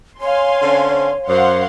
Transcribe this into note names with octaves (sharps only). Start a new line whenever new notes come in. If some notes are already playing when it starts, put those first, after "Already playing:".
C#5 F5 G#5 C6
D3 C4 C#4
F#2 C5 F5 F#5 C6